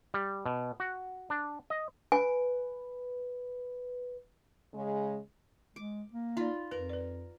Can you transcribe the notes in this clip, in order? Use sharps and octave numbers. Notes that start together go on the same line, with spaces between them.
G3
B2
F#4
D4
D#5
B4 G#5
C#3 G#3
G#3 D6
A#3
D#4 F4 D5 B5
F2 A#4 B4
B4 D5